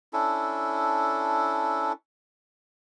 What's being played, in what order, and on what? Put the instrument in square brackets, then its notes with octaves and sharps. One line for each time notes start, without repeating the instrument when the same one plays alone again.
[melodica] C#4 D4 E4 A4